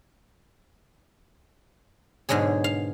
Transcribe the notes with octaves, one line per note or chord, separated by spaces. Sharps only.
G#2 B2 D3 F#3 G#4
F5